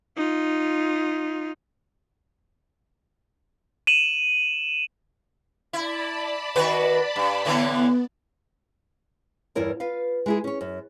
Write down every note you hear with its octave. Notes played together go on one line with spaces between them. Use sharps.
D#4 F4
D#7 E7 F#7
E4 D5 A5 B5
D#3 F#4 B4
G2
A2 D3 E3 B3
E2 G2 E4 A#4 C#5
F4 B4 F5
G#3 E4 G#4
C#4 C#5
F#2